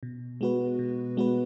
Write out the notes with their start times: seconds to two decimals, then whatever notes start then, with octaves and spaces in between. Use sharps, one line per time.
0.03 B2
0.41 G#3 B3 F#4 B4
0.79 B2
1.17 G#3 B3 F#4 B4